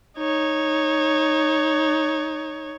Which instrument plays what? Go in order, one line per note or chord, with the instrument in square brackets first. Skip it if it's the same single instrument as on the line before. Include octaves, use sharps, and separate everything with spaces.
[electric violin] D#4 C#5